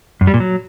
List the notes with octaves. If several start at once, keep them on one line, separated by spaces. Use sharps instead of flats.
F#2
G3
A#2
F#3